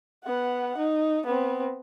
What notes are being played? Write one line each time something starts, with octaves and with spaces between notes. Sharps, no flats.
B3 F#5
D#4
B3 C4